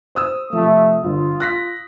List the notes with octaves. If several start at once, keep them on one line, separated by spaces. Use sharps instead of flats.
C5 D#6 E6
C3 F3 A3
G1 F4
F#6 A#6 B6